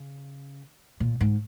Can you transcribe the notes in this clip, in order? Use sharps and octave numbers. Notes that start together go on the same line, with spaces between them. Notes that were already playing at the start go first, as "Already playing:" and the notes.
Already playing: C#3
A#2
G#2